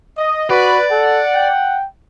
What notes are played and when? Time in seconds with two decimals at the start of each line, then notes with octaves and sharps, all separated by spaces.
0.18 D#5
0.50 F#4 B4 D5
0.91 A4 F#5
1.35 G5